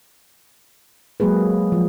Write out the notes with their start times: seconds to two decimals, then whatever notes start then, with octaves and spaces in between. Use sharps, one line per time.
1.20 F#3 G#3 A#3 G#4 B4
1.72 F3